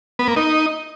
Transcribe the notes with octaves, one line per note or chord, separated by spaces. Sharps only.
B3
A#3
D#4